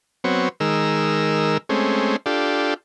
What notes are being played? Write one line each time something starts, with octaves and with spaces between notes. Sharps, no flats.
F#3 B3 C4 C#5
D#3 G#3 A#4 E6
G#3 A3 C4 C#4
D4 F4 G4 A4